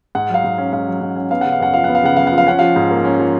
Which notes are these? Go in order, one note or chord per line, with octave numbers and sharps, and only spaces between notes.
G#2 F#5
F#3 F5
G#2
C#4
G#2 F5
F#3
G#2
C#4
B3 F5
C#3 F#5
F5
F#2 F#5
F3 F5
B3 F#5
F5
C#3 F#5
F#2 F5
F#5
F3
F5
C#4 F#5
F3 F5
G#2
A#3
C#4
F3